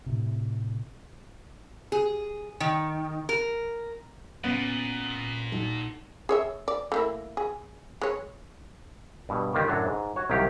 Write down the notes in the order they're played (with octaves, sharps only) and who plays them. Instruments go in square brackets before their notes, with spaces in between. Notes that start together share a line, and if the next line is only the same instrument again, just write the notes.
[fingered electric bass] A2 C3
[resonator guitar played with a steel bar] G#4
D#3
A#4
[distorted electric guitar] A#2 [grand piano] B3 [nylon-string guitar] C#4
[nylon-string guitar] D#4 F#4 A4
[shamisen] G#4 C#5 E5
D5
A3 A#3 E4
G#4
G#3 C#5
[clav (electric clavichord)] G2 B2
D#3 G3 A#3 F4 G4
F#2 A2 F#3 D4 A4
G#2
F#4 C#5
C2 D#3 F#3 G4 F5